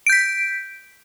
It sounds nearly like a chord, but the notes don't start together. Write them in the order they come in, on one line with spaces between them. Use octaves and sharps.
D7 G6 B6